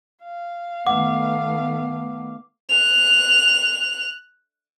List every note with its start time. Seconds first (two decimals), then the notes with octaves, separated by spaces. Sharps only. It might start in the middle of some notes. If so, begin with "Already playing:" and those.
0.23 F5
0.87 D#3 A3 B3 F#5 D6
2.69 F#6 F7